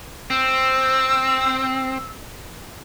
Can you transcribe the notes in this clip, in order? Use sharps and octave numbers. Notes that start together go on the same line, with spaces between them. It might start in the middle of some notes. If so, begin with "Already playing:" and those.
C4 E6